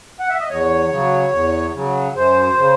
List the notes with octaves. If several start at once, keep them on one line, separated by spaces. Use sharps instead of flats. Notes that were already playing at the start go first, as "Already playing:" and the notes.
F#5
E5
D#5
E2 C#5
C#3 F#3
E2
C#3 F#3
F#2 C5
C#3